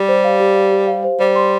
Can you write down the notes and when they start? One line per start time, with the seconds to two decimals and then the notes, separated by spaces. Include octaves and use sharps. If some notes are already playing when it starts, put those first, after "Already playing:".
Already playing: G3 G4
0.09 C5
0.24 F5
0.40 G4
0.55 F5
0.72 G4
0.87 F5
1.04 C5
1.20 G3 C5
1.36 C6